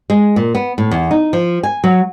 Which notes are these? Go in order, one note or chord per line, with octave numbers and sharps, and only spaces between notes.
G#3
A#2
B3
A2
E2
D#4
F3
G#5
F#3